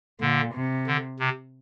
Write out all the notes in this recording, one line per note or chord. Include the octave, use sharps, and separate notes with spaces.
A#2 D3
C3
D3
C3